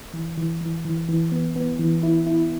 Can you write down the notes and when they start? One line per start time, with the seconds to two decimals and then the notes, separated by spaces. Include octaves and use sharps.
0.14 E3
0.38 E3
0.61 E3
0.85 E3
1.09 E3
1.32 B3
1.56 B3
1.79 E3
2.03 E4
2.27 E4